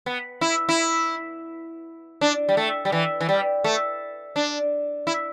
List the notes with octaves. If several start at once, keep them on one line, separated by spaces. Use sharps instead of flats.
B3
E4
E4
D4
G3
A3
G3
E3
E3
G3
A3
D4
E4